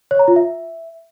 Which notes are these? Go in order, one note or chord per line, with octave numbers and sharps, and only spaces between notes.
C#5
A#5
F4
E5